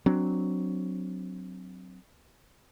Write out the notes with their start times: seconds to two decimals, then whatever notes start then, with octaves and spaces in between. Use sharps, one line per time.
0.06 F#3 C4 D4